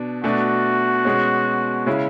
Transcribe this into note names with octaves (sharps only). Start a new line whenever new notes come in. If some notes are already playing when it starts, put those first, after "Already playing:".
Already playing: B2 D4
B2 A3 D4 F#4
B2 G#3 C#4
C#3 G#3 C#4 E4